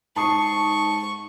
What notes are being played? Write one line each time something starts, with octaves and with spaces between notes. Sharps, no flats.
G#2 A5 C#6 D#6 C7